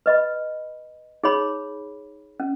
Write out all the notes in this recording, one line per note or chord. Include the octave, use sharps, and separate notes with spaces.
B4 D#5 B5
D#4 G#4 C#5 B5
C#4